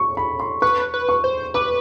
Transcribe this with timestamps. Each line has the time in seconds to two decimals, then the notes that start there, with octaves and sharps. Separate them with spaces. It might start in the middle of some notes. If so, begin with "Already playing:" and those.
Already playing: C#6
0.17 B5
0.40 C6
0.62 B4 C#6
0.94 B4
1.09 C#6
1.24 C5
1.54 B4 D6